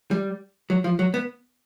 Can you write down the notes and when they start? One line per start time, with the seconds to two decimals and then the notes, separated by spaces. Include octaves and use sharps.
0.11 G3
0.70 F#3
0.84 F3
0.99 F#3
1.14 B3